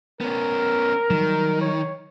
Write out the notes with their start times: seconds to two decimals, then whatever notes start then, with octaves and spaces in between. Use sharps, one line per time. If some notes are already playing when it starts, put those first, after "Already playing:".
0.21 B3 C#4 A#4
1.10 D#3 F#3 G3
1.61 C#5